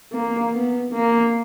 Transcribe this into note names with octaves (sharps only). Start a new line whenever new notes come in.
A#3
B3
A#3